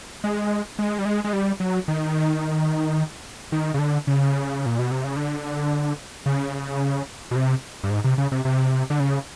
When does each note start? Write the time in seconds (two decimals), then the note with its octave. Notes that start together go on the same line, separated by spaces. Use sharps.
0.24 G#3
0.79 G#3
0.99 G3
1.05 G#3
1.24 G#3
1.33 G3
1.60 F#3
1.88 D#3
3.52 D#3
3.74 C#3
3.79 D3
4.07 C#3
4.66 A#2
4.79 B2
4.91 C3
5.04 C#3
5.16 D3
6.26 C#3
7.31 B2
7.36 C3
7.84 G2
7.90 G#2
8.04 C3
8.18 C#3
8.32 C3
8.45 C3
8.90 D3
9.00 C#3